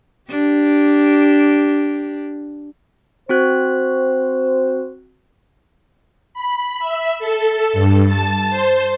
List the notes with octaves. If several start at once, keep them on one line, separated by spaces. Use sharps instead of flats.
D4 G4
C4 F#4 C5 F#6
B5
E5
A4
G2
A5
C5